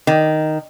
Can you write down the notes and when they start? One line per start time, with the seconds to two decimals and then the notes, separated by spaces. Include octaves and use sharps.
0.07 D#3